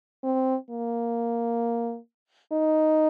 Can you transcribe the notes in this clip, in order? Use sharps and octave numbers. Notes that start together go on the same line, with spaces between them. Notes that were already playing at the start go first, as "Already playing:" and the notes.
C4
A#3
D#4